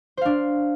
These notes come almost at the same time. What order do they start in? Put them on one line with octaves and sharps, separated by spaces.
C5 F5 D4